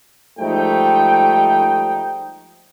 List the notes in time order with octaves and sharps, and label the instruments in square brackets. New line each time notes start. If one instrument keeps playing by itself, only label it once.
[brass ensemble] G#2 F3 G3 A3 D#4 G5